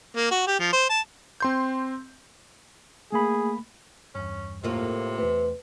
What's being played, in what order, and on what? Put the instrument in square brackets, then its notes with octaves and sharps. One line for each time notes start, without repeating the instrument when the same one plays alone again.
[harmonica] A#3
F#4
G4
F3
C5
A5
[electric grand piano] C4 C6 G6
[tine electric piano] A3 A#3 B5 [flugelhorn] G#4
[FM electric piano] E2 G2 [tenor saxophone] C#4
[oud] A2 A#3 F4 [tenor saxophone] C3
[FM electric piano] E2 A3 [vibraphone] B4